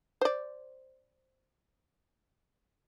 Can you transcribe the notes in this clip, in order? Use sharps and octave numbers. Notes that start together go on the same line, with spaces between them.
C5 D5